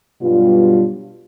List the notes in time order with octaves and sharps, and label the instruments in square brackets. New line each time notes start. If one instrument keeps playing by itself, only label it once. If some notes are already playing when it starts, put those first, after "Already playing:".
[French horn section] G2 B2 F#3 G3 F4